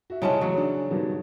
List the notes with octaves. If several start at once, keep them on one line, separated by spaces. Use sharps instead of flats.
F#4 E5
C2 C#3 G#3 C#4 E4 A5
A1 F#3 F#4
D4
G2 B2 D#3